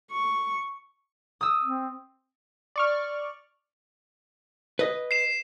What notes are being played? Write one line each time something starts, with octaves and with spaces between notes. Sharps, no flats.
C#6
D#6 E6
C4
D5 C#6 F6
B4 D#5
C7 E7